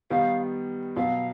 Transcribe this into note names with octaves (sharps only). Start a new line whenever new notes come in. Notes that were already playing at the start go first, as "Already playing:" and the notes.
D#3 G3 B3 F5
B2 F#3 B3 F5